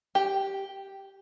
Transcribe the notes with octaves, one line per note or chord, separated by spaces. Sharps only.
G4